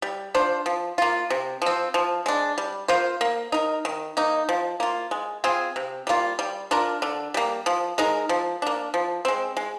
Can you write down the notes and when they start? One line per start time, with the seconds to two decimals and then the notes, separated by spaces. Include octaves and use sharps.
0.02 G3
0.34 D4 F4 C5
0.66 F3
0.98 A#3 F4
1.30 C3
1.62 F3 C4
1.94 F3
2.26 G#3 D4
2.58 G3
2.88 A#3 F4 C5
3.21 A#3
3.52 D#4 A#4
3.85 D#3
4.17 A#3 D#4
4.49 F3
4.80 A#3 F4
5.11 G#3
5.44 C4 F4 G#4
5.76 C3
6.07 G3 A#3 F4
6.39 G3
6.71 D4 F4 A#4
7.02 D3
7.34 G3 A#3
7.66 F3
7.98 G#3 D#4 A#4
8.29 F3
8.62 A#3 D4
8.94 F3
9.25 G#3 C4
9.57 G#3